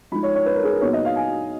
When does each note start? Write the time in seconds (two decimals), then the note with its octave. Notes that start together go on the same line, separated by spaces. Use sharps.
0.12 F3 G#3 D#4 B5
0.23 C#5
0.35 C#5
0.46 B4
0.55 A#4
0.64 G#4
0.72 A#4
0.81 A#2 F#3 B3 D#4 C#5
0.93 D#5
1.05 F5
1.16 G#5